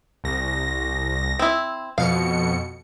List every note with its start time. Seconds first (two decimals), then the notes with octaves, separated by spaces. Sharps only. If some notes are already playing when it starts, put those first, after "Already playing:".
0.24 C2 A#6
1.39 C4 E4
1.98 F2 B2 F5 C#7